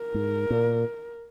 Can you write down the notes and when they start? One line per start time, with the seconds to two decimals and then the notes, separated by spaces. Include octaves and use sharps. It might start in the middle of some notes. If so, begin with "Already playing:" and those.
Already playing: A#4
0.14 G#2
0.50 A#2